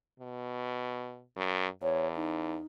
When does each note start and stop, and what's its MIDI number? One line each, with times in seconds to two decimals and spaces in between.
0.20 1.22 47
1.37 1.67 42
1.82 2.57 40
1.82 2.07 73
2.15 2.66 63